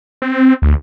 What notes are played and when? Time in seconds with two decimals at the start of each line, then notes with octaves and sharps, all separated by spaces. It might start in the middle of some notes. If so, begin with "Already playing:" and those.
0.22 C4
0.62 D2